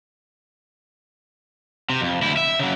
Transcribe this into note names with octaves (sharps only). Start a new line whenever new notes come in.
C3
F2
D2 E4
E5
C#3 F#3